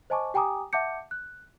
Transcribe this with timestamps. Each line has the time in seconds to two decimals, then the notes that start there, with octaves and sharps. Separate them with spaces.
0.10 C5 D#5 G#5 A5 C#6 D6
0.34 G4 G5 G#5 A#5 D6 D#6
0.73 E5 F#5 A5 D6 G6 C#7
1.11 F#6